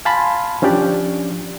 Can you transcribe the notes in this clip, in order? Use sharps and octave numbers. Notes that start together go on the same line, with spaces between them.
F5 G#5 A5 B5 C6
F3 C#4 D4 G4 D5